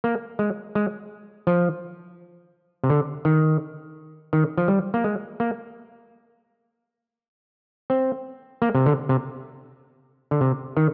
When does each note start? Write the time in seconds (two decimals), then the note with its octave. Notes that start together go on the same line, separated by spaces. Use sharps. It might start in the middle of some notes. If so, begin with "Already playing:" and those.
0.04 A#3
0.39 G#3
0.75 G#3
1.47 F3
2.84 C3
2.90 D3
3.25 D#3
4.33 D#3
4.58 F3
4.68 G3
4.94 A#3
5.04 G#3
5.40 A#3
7.90 C4
8.62 A#3
8.75 C3
8.86 D3
9.09 C3
10.31 D3
10.41 C3
10.77 D#3